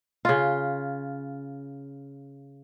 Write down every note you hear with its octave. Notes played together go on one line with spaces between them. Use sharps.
C#3 F4